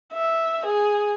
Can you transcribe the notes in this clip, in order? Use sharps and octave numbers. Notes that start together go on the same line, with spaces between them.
E5
G#4